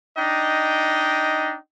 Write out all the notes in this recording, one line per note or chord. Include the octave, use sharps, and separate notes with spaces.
D4 D#4 D#5 G5